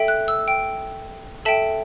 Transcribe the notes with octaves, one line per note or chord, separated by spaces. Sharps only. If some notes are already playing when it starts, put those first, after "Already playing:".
Already playing: A4 E5 G5
F#6
E6
G5
A4 E5 G5 A5